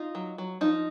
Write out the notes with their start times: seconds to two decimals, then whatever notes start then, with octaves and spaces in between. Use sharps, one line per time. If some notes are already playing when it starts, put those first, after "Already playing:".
Already playing: D#4 F4
0.15 F#3
0.38 F#3
0.61 F3 D#4